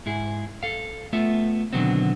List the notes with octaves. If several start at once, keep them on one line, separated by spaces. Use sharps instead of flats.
G#2 E4 G#4
A4 F5
A3 B3 F4 E5
B2 D3 D#3 F#3 B3 C4